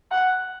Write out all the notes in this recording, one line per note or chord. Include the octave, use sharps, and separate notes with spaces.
F#5